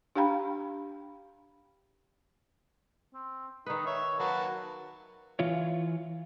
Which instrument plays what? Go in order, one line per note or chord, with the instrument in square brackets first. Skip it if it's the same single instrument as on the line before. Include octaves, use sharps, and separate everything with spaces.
[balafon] D4 G4 F5 G5 A#5 B5
[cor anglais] C4
[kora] D#3 B4 [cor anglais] D#4
[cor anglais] C#5 [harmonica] E5
[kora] F#3 [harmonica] A#3 F#4 A5 [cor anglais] B4
[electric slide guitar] E3 F4 C#5